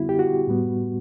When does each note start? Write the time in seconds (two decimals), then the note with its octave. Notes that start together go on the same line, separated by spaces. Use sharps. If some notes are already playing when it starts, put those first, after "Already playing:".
Already playing: D3 G3 B3 E4 F#4
0.09 G4
0.19 F#4
0.47 A2 G3 B3